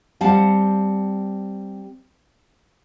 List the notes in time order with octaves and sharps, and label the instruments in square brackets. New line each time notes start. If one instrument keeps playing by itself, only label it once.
[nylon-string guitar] G3 C4 F5 F#5 A5